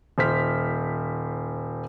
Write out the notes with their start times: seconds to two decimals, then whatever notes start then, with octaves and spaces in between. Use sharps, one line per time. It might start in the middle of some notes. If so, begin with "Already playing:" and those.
0.18 D#1 C5 F6 B6